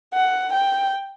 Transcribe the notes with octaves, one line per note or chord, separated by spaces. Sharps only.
F#5
G5